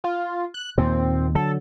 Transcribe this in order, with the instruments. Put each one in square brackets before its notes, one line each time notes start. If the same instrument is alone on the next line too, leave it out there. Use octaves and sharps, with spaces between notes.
[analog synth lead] F4
F#6
[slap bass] D#2 A#2 [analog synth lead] C4
[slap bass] D3 F#3 [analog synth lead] A4